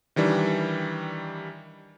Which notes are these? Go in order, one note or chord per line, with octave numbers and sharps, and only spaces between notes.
D#3 E3 G3 D4